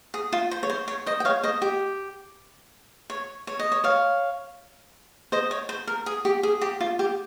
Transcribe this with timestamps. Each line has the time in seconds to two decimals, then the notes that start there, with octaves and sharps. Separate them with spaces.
0.14 G#4
0.32 F4
0.51 C5
0.63 C#5
0.70 C5
0.88 C#5
1.06 C5 D#5
1.20 G5
1.25 C#5 F5
1.43 C5 D#5
1.62 G4
3.10 C#5
3.47 C#5
3.59 D#5
3.72 C#5
3.84 C#5 F5
5.32 C5 D#5
5.51 C#5
5.69 C5
5.87 A#4
6.06 G#4
6.25 G4
6.43 G#4
6.61 G4
6.80 F4
6.99 G4